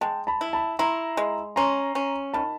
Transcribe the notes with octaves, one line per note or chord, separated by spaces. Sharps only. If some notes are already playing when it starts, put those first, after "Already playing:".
G#3 G5 A5
A5 B5
E4
A5 B5
E4 A#5 C6
G#3
C#4 A#5 C6
C#4
D#3 A5 B5